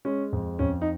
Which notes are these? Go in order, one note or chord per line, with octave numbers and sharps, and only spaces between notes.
G#3 C#4
F2
F2 C#4
D#4